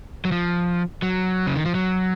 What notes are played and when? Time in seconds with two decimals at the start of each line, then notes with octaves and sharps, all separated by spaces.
0.25 F#3
0.32 F3
1.02 F#3
1.47 C#3
1.56 D#3
1.66 F3
1.75 F#3